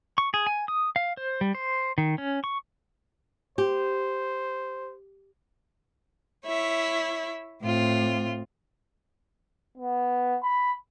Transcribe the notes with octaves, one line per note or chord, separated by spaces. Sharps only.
C#6
G#4
G#5
D#6
F5
C5
G3
C5
D#3
C#4
C#6
G4 C5
E4 C#5 E5
A2 C4 F4
B3
B5